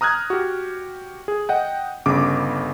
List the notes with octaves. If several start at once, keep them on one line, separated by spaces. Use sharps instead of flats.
A#5 D#6 F6 F#6 G#6
F#4 G4
G#4
D#5 F#5 G5
G1 C#3 D6